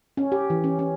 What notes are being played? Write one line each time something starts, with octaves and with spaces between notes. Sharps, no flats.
C#4
G4
E3
C#4
C#4